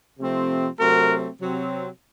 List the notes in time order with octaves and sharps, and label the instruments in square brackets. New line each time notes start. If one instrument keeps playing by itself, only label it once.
[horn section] C3 F3 A3 C4
C3 F#3 A3 C4 F#4 A#4
C3 F#3 C4